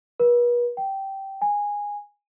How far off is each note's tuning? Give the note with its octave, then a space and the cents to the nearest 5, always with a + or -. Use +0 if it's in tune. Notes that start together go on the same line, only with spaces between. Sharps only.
B4 -40
G5 -15
G#5 -15